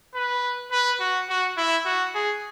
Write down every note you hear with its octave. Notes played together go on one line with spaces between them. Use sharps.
B4
B4
F#4
F#4
E4
F#4
G#4